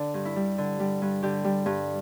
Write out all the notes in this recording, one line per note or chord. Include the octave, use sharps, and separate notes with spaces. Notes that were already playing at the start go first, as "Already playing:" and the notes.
Already playing: D3 D4
G2
E4
G3
D3
G3
G2
D3 G4
G3
G2